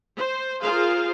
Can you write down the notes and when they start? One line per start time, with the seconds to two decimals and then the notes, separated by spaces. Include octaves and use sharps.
0.18 C5
0.61 F4 G#4 A#4 C5 F5